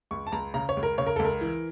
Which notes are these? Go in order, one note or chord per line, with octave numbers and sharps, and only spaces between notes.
C#2 C#6
A5
C#2 A#5
C#3 A#5
C#5
C#2
A#4
C#3 C#5
A#4
C#2 A4
A#4
E3